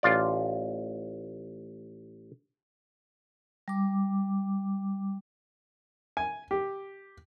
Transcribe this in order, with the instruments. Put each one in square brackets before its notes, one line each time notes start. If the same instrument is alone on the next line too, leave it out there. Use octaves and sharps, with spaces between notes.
[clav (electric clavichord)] A1 F4 D5
[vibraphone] G3 D6
[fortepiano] G#5
G4